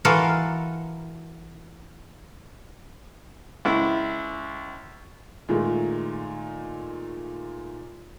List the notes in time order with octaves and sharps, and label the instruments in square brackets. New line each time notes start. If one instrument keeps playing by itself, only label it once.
[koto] E3 F4 F#4 A4 A#4
[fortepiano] C#2 E4
[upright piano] A#2 D#3 G#3 A3